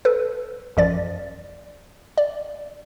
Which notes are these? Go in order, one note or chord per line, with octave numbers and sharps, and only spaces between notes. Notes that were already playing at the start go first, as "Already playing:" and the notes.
A4 B4
A1 F#2 F3 D5 A6
D5